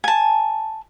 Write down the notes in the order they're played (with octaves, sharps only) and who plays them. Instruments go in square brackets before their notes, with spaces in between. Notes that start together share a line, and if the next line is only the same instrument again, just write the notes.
[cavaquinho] G#5 A5